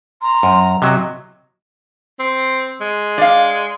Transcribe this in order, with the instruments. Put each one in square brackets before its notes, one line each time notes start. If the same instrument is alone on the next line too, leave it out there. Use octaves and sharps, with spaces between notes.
[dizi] A#5 [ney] C6
[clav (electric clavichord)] F#2
[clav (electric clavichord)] C3 F#3 [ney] D#5
[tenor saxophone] C4
G#3
[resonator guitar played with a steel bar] D5 F5